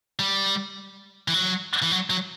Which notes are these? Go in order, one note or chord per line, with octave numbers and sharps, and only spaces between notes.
G3
E3
F#3
E3
F#3
F#3